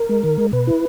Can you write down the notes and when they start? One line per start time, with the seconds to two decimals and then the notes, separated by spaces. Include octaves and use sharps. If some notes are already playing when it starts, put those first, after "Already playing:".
Already playing: A#4
0.09 G#3
0.24 D#3
0.38 G#3
0.53 B2 B4
0.67 E4